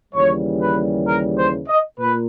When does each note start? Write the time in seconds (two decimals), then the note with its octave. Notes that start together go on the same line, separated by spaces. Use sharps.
0.14 D#2 C#3 E3 G3 C#5
0.60 B4
1.06 A#4
1.38 C5
1.68 D#5
1.99 A#2 B4